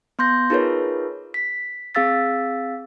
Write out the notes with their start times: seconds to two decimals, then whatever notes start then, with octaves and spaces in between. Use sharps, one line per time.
0.19 B3 C6 G6 A#6
0.50 D#4 F4 G#4 A#4 B4 C#5
1.34 B6
1.95 C4 G#4 F5 E6 A6 B6